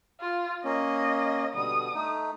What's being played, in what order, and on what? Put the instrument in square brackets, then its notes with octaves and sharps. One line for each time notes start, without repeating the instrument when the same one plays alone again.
[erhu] F4
[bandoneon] A#3 C#4 [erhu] D#5
[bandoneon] B2 D3 G3 [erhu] D#6
[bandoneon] A3 D#4